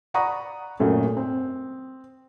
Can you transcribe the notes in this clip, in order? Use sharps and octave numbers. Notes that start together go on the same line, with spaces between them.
D5 F#5 A#5 B5 C#6 D#6
G#1 F#2 A#2 A3
C4